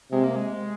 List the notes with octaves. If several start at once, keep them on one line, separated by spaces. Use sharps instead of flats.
C3 G#3
A#3
G#3